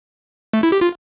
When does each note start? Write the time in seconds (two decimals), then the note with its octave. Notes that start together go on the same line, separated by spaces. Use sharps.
0.53 A3
0.63 E4
0.72 G4
0.81 F4